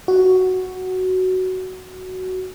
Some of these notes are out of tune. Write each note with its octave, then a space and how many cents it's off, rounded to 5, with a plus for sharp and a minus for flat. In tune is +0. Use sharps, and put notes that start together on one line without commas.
F#4 +5